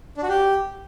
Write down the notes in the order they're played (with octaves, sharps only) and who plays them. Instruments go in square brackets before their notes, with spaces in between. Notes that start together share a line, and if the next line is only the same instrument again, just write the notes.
[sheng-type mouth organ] D4
F#4
G4